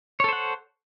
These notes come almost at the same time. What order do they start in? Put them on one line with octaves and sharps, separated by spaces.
C#5 A4 C5 F#5